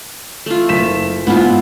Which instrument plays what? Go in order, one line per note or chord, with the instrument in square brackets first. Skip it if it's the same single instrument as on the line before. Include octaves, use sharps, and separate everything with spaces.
[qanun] A3 F4
[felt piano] F#1 B6 E7
[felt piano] G#2 [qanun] B3 E4 F4